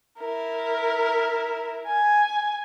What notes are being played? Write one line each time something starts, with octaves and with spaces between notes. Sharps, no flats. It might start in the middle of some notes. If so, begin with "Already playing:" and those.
E4 A#4
G#5